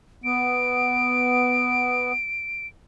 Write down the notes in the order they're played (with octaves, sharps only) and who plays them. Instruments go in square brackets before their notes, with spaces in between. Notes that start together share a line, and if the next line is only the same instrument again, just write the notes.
[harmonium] B3 [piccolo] D7